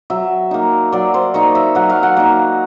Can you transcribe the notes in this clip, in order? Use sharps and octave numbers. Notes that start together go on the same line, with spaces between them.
F#3 E5
A#3 D#4
F#3 D5
C5
A#3 D#4 C#5
E5
F#3 F#5
F5
F#5
A#3 D#4